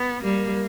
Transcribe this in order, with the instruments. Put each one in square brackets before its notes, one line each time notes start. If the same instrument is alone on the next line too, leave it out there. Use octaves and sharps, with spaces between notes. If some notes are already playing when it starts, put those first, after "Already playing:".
Already playing: [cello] B3
[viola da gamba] G3 [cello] A#3